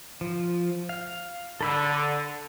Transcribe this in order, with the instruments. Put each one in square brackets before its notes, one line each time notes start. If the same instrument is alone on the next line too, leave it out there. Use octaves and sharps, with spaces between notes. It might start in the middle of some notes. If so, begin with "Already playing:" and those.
[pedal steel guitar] F3
F5
[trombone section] D3 [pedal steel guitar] A4 B5 E6